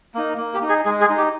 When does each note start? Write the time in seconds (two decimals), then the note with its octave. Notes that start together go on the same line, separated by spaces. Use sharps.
0.14 A#3 D#4
0.38 A#3
0.54 G4
0.62 D#4
0.69 G#4
0.85 G#3 G#4
1.01 G#4
1.10 D#4
1.18 G4